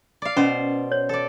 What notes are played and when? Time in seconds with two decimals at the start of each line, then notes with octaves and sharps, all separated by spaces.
0.22 D5 F5
0.37 B2 C#4 C5
0.92 C#5
1.09 A4 D5